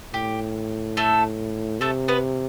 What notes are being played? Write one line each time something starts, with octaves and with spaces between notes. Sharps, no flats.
A2 G4
A3 A4
C3 A3 A4
B3 B4